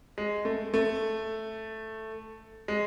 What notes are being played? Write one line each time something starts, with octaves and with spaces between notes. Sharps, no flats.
G#3
A3
A3
G#3